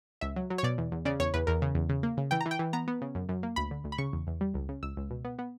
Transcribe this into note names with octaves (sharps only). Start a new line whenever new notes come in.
C#2 E5
F#3
F#3
C#5
B2 D5
E2
E2
C#3 D5
E2 C#5
E2 B4
E2 A#4
C#3
E2
C#3
A#3
C#3
E3 G5
A#5
E3
G5
E3
B3 A#5
B3
C#3
F#2
F#2
A#3
D2 B5
D3
D2
B5
C#3 C#6
E2
E2
G3
C#2
C#3
C#2 E6
C#2
B2
B3
B3